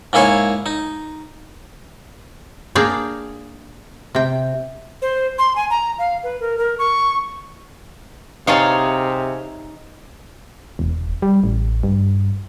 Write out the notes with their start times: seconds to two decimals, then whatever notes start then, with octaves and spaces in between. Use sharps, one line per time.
0.13 G#2 A#3 E4 G#4 C#5
0.66 D#4
2.75 A#3 D4 G#4 D5 F5 G5
4.15 C3 G5
5.02 C5
5.39 C6
5.56 G#5
5.70 A#5
5.99 F5
6.23 B4
6.40 A#4
6.58 A#4
6.79 C#6
8.47 C3 D#4 G#4 C#5 F5 A5
10.79 E1
11.22 G3
11.44 A1
11.83 G2